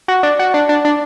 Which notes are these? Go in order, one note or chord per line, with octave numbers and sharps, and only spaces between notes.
F#4
D4
F#4
D4
D4
D4